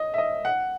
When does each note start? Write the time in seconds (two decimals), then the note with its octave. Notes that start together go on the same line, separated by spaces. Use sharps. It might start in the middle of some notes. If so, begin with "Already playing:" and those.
Already playing: D#5
0.14 E5
0.18 D#5
0.45 F#5